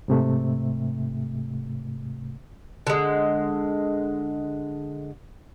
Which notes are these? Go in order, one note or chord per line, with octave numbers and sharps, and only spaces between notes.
G#2 C3 A3
D3 G#3